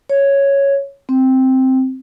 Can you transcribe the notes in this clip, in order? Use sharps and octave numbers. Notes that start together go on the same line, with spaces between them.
C#5
C4